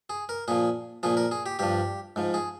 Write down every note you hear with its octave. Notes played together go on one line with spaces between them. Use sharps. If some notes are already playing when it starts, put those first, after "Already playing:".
G#4
A#4
A#2 F3 G#4
A#2 F3 G#4
A#4
G#4
G4
G2 F3 G4
G#2 F3
G#4